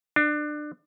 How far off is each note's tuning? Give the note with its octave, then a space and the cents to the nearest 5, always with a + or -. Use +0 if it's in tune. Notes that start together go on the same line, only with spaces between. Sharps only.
D4 +25